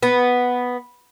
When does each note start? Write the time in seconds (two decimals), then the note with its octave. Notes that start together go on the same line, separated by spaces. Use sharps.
0.03 B3